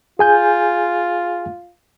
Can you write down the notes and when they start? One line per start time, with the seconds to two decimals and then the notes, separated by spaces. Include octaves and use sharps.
0.19 F4 G#4 G#5 G6